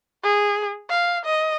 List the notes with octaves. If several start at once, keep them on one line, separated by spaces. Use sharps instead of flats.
G#4
F5
D#5